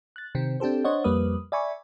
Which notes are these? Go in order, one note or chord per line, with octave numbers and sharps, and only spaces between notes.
F#6 A6
C3 D#3 C4
C4 D4 G4 A4 C5
D4 C5 C#5 D#5 F#5
F2 G3 A#3 B4 D#6
D5 E5 G#5 B5 C#6